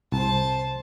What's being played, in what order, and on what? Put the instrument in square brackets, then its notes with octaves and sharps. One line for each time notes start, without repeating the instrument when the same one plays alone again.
[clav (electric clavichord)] C2 [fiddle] C5 A5